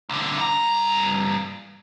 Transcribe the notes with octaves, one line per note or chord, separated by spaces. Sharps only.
C2 D3
G2 A#5